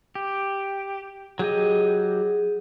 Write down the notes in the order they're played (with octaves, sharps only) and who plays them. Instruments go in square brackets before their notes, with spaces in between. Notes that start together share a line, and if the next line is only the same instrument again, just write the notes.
[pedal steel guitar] G4
[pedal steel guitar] F#3 G4 D#5 [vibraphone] G#4